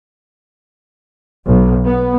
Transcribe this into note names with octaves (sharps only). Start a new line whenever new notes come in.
B1
B3